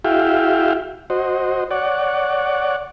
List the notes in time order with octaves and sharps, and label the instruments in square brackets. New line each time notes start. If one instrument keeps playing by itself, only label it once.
[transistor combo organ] E4 F#4 G#4 E5 F5 G5
F#4 C5 D#5
C#5 D5 F#5